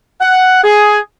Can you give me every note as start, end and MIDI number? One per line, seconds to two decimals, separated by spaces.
0.21 0.58 78
0.64 0.98 68